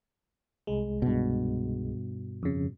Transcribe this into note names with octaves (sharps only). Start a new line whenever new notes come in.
C2 G#3
G2 B2
F2 C#3